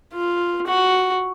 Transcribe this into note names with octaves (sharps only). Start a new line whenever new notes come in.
F4
F#4